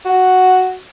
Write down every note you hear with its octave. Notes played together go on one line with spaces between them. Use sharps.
F#4